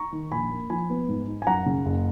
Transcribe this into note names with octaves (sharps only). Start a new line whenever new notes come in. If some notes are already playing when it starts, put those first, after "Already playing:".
Already playing: A#5 C#6
D#3
A#1 G#5 B5
A#3
F3 G#5 B5
B3
G#2
D#4
G#5
F#2 F#5 A#5
C#3
F#1